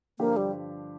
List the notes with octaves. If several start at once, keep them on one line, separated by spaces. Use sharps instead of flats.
G2 D3 F3 A#3 D4 G4
G3